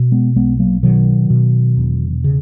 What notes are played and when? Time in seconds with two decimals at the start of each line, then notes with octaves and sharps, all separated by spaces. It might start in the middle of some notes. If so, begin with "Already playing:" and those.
Already playing: B2
0.12 G#3 B3
0.36 B1 G#3 B3
0.59 F#3 A#3
0.83 B2 D#3 F#3
1.30 B2
1.77 E1
2.24 C#3